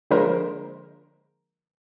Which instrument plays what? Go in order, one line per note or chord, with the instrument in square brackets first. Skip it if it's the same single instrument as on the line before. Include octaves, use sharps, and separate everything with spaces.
[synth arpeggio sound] D3 F3 G#3 A#3 A#4 C5